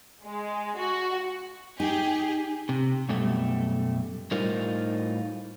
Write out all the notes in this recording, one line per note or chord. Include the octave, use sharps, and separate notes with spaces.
G#3
F#4
D#4 G4 G#4
C3
F#2 B2 G3 A3
A2 G3 D#4 F4 A#4 C5